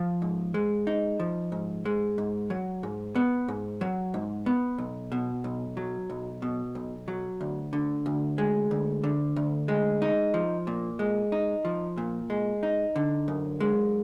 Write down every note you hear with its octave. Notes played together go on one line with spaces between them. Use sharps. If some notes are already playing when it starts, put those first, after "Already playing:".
Already playing: F3
G#2
G#3
D#4
F3
G#2
G#3
G#2
F#3
G#2
B3
G#2
F#3
G#2
B3
B1
B2
B1
F#3
B1
B2
B1
F#3
D2
D3
D2
G#3
D2
D3
D2
G#3
D#4
F3
A#2
G#3
D#4
F3
A#2
G#3
D#4
D3
F#2
G#3